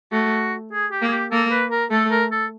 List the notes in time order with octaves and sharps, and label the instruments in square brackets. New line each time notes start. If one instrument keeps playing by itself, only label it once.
[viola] A3 [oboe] F#4
[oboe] G#4
G4
[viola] A#3
[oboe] G#4
G4
[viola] A#3 [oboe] A4
[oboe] B4
A#4
[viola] A3 [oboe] A4
[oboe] A#4
A4